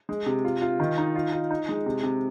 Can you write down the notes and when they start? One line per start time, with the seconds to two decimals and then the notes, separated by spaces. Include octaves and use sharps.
0.09 G#3
0.26 C3
0.45 F4
0.62 F4
0.80 D#3
0.98 D#4
1.16 F4
1.32 F4
1.51 D#4
1.69 G#3
1.86 C3
2.03 C3